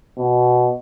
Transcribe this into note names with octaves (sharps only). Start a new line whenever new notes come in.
B2